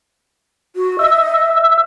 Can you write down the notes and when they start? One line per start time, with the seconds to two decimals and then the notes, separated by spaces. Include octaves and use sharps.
0.76 F#4
0.99 D#5 E5